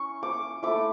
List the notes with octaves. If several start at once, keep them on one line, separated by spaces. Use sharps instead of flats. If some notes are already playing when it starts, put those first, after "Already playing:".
Already playing: C#4 E4 C#6
D6
A3 E4 D6